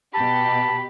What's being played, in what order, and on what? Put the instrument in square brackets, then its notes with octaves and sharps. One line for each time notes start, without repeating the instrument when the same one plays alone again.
[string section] B2 G4 [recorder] A5 [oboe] B5